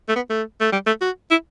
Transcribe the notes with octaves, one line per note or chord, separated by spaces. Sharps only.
A3
B3
A3
A3
G3
A3
F#4
E4